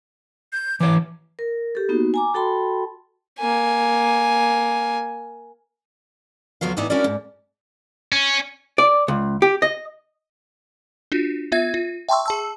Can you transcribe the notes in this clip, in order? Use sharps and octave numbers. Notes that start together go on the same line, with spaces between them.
G6
E3 C#5 D6
A#4
G4 A4
A#3 B3 D#4 F#4
G#5 A#5 D6
F#4 A4 G5 A5 B5 C6
A#3 G#5
D2 F3 F#3 B3 F5
A2 E3 B3 D#4 E4 D5
C#4 D4 E4 F#4 A#4 D5
G#2
C#4
D5
C#2
G4
D#5
D4 F4 F#4
B3 F4 E5 G#6
F4
E5 G5 A5 C6 C#6 E6
G#4 A5 E6